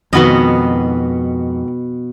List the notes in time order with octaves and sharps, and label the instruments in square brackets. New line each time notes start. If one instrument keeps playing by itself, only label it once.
[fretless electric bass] F2 [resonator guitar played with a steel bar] G#2 D#3 F#4 [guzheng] B2 B3 D#5